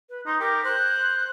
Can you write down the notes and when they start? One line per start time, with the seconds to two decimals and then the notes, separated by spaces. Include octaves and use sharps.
0.10 B4
0.26 D#4 C6
0.40 G4 A#4
0.65 C5 F#6